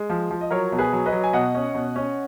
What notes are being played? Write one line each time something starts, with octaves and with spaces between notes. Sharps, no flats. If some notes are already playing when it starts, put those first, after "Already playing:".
Already playing: G#3
F3
F3
D#5
F#3 A#4 C#5
B2
G#4 B4
F#3
B4 D#5
F#3
G#5
B2 D#5 F#5
C#4
B2
C#4